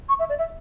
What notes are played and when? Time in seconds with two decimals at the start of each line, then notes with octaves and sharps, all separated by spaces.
0.09 C#6
0.19 E5
0.29 D5
0.39 E5